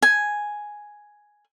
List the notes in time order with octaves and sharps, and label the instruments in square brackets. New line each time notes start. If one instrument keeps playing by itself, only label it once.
[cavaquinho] G#5